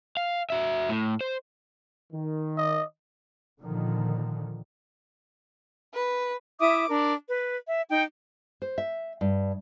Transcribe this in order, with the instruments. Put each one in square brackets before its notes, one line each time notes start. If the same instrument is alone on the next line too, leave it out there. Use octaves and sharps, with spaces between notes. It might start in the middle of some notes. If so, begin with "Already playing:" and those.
[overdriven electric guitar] F5
F#4 E5
A2
C5
[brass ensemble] D#3
[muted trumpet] D#5
[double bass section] A#2 D3 D#3 F3
[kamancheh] B4
[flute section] E4 E5 D6 D#6
D4 A#4
B4
E5
D#4 G5
[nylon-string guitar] C5
E5
G2